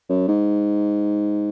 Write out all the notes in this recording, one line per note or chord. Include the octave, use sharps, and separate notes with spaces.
F#2
G#2